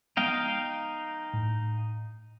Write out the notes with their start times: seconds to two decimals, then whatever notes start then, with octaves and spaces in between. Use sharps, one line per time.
0.17 F3 G#3 B3 D#4 F5 G5
1.33 A2